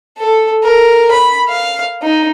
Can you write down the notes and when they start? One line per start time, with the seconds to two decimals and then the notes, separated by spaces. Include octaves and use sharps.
0.18 A4
0.63 A#4
1.11 B5
1.48 F5
2.02 D#4